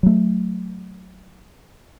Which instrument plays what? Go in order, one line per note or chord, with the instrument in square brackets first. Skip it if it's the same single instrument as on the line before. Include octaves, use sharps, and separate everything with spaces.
[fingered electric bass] F#3 A3